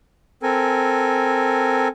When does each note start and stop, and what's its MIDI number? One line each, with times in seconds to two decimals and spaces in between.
0.43 1.88 60
0.43 1.88 69
0.43 1.88 70
0.43 1.88 80